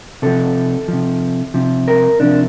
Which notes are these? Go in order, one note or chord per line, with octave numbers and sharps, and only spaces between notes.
C3 F3 A4
C3 F3
C3 F3
A#4
C3 F3 D4